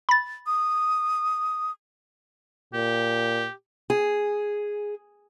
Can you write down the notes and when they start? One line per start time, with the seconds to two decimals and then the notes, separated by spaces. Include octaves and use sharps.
0.09 B5 A6
0.47 D#6
2.74 A#2 G4
3.90 G#4